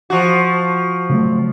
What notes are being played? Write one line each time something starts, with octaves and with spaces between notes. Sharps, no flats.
F3 F#4
C#3 F#3 A3